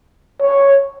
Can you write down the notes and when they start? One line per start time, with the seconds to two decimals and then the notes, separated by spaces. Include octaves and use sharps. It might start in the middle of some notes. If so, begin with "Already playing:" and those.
0.41 C#5